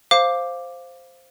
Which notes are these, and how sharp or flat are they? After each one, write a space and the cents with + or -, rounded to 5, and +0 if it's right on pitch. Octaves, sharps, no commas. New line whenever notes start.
C5 +0 F5 +0 D6 +0